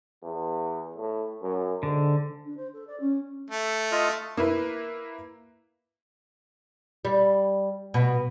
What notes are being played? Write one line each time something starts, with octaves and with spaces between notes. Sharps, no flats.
E2
A2
F#2
G#2 D3
D4
C5
A4
D5
C#4
A3
F4 D#5 F6
A#3 E4 B4
G3
B2